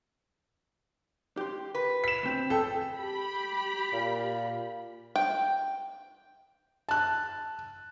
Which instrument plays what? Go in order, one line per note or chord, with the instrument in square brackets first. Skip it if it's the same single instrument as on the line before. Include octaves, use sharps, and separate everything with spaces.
[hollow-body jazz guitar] G4 C6
[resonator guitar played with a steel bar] B4
[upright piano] B6 E7
[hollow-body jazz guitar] D2 C4
[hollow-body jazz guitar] G#4 C#5 G5 [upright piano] A4
[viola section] G4 B5
[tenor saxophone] A#2
[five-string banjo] G5
[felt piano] A5 F#6